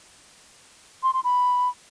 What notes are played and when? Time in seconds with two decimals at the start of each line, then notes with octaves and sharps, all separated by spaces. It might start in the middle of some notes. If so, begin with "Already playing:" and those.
1.03 C6
1.13 C6
1.24 B5